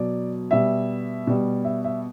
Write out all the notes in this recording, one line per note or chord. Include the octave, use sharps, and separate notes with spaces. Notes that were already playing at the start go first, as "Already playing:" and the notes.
Already playing: B2 F#3 D5
B2 G3 E5
B2 G3
E5
E5